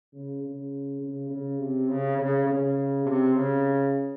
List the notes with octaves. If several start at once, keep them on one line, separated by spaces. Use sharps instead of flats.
C#3
C#3
C#3
C#3
C3
C#3
C#3
C#3
C3
C#3